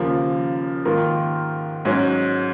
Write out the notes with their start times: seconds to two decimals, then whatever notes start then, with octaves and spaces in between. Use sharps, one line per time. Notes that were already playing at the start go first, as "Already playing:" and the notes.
Already playing: D#2 C#3 F3 A#3
0.85 G#2 D#3 A#3 F4 A#4
1.85 G#2 F#3 C#4